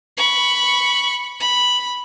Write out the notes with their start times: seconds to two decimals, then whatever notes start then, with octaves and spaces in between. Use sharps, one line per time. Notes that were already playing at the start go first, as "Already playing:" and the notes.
0.17 B5 C#6
1.40 B5